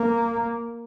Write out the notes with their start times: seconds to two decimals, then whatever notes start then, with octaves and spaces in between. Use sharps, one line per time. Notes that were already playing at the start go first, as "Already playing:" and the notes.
Already playing: A#3